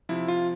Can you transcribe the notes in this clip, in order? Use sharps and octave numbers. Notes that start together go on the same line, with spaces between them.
C3 F3 E4
F4